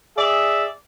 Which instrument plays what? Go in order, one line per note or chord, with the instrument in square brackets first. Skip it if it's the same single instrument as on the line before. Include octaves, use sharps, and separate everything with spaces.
[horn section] G#4 D5 E5